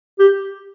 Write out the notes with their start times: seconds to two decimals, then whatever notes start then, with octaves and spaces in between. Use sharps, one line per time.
0.19 G4